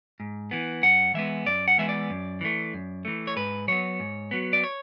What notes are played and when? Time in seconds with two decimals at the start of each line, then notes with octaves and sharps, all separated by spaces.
0.20 G#2
0.51 E3 B3
0.83 F#2 F#5
1.14 E3 G#3 B3 E5
1.46 F#2 D5
1.68 F#5
1.78 E3 G#3 B3 E5
1.89 D5
2.10 F#2
2.41 E3 A3
2.74 F#2
3.05 E3 A3
3.27 C#5
3.36 G#2 B4
3.68 F#3 B3 C#5
4.00 G#2
4.31 F#3 B3
4.53 D5
4.64 C#5